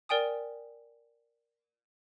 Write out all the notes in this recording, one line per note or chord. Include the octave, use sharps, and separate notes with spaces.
A#4 D5 G5 G#5 D#6